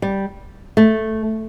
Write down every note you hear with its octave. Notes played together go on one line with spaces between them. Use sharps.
G3
A3